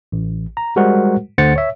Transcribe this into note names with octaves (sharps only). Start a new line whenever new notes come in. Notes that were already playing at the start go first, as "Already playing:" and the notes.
A1
A#5
G3 G#3 F#4 A#4 C5 F#5
D2 D3 C5 F#5 A6 C#7
C#5 E5